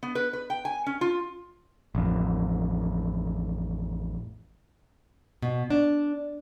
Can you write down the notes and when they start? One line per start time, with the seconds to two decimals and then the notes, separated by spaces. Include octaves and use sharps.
0.03 B3
0.15 B4
0.33 B4
0.50 G5
0.65 G#5
0.86 C#4
1.01 F4
1.95 A1 F2
5.42 B2
5.70 D4